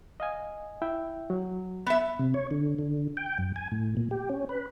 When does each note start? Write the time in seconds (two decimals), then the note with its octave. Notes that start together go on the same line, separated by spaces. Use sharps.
0.20 D#5 F5 G#5
0.82 E4 E5 G5
1.30 F#3
1.86 B3 E5
2.19 C3
2.34 C#5
2.51 D3
2.79 D3
3.17 G5
3.38 F#2
3.56 G#5
3.72 A2
3.97 A#2
4.11 G4
4.30 C#4
4.49 B4